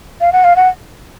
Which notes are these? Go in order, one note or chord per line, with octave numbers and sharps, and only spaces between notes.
F5
F#5
F5
F#5